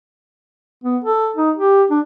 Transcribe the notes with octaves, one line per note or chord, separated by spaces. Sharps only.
B3
A4
D#4
G4
D4